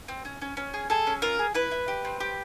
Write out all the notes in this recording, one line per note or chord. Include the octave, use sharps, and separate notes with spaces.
C4
C#4
C#4
C#4
G#4
G#4 A4
C#4
F4 A#4
G#4
E4 B4
E4
G4
C4
G4